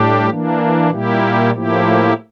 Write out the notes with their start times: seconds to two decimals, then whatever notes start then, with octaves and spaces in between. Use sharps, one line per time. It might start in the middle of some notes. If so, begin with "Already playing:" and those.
Already playing: A2 G3 D4 G4
0.29 E3 A#3 D4
0.91 A#2 G3 A#3 E4 G4
1.52 A2 F3 A#3 E4 G4